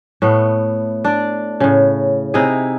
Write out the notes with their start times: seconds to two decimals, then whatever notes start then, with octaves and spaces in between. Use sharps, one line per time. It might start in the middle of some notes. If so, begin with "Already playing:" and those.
0.22 A2 A3 B3
1.05 D4 D5
1.60 A2 C#3
2.34 C3 D#4 E4 G#4